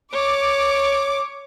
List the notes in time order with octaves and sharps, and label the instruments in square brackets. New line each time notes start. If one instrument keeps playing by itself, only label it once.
[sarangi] C#5 [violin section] D6